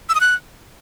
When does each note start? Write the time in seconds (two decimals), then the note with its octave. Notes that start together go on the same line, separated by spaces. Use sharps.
0.09 E6
0.15 D#6
0.21 F#6